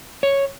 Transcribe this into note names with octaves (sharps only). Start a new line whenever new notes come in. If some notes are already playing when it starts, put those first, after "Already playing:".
C#5